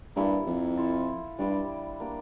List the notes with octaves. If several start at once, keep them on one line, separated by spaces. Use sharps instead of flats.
G2 A#3 E4 A4
F2
E4 A4 C5 F5
G2 G3 D4 G4 D5
A#3 D4 G4